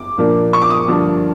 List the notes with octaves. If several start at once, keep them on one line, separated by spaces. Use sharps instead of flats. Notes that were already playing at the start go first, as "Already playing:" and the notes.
Already playing: D6
A#2 F3 A#3 D4
C#6
D6
D#6
G2 D3 F3 A#3 D4